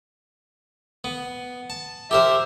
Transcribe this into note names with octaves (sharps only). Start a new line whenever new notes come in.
B3
A5
G4 A#4 C5 E5